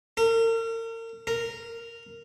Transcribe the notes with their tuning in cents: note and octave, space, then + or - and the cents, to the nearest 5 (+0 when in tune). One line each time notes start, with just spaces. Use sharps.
A#4 -40
A#4 -10